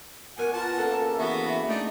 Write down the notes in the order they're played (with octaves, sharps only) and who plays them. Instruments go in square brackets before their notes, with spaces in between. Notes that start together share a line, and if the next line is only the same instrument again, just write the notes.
[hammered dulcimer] B2 C#6 D6 [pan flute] A#4 [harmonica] F#5 G#5
[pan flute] F4 [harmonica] A#4 F#5 A5
[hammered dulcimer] C#3 A#3 D4 [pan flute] A4
[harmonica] E3 B3 F#4 [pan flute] E5
[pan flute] A3 [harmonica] D4 D#4